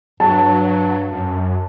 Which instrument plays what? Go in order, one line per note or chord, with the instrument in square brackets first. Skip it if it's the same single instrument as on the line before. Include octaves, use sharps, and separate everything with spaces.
[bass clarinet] G2 [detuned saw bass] F#3 [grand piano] A5
[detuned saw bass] F#2